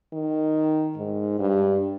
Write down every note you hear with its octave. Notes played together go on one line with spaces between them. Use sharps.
D#3
G#2
G2